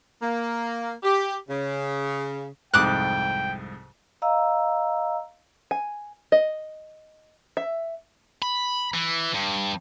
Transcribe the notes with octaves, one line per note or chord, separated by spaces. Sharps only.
A#3
G4
C#3
C2 F2 G#2 G5 D6 D#6 F#6
D#5 F5 A#5 E6
G#5
D#5
E5
B5
E3
G2